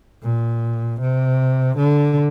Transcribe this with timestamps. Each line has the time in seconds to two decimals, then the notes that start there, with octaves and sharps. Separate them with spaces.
0.23 A#2
1.00 C3
1.77 D3